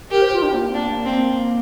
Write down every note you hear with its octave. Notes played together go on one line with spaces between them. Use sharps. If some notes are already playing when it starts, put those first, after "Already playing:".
G4 A#4
C5
F4
D4
A#3
C4
A#3 D4
A#3
A#3 C4